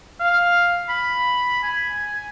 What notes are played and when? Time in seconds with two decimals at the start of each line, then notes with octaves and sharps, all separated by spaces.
0.20 F5
0.89 B5
1.64 G#5